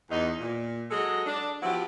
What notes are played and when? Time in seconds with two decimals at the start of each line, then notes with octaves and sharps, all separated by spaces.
0.10 E2 D#4
0.40 A#2
0.91 F#3 G#3 F#4 G#4 A4 D#5
1.26 D4
1.63 F3 F#3 B3 E4 F#4 G4